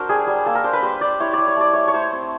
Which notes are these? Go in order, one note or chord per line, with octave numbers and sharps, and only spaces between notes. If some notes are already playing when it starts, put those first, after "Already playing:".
Already playing: F#3 D4 A#4 C5
G3 G#4
G3
A#3 A4
A#4
D4 C5
B4
G3 C5
G3 D5
E4 C#5
G3 D5
C#5
A3 D5
A3 C#5
C#5
A3 C5
C4